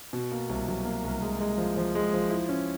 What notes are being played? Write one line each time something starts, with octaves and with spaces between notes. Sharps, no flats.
B2
A#3
C2
F#3
A#3
C2
G#3
G#3
F3
F3
G#3
F3
E4
C#4